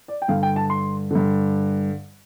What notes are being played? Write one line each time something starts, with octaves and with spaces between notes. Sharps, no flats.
D5
G5
G2 D3 F5
G5
A5
C6
G2 D3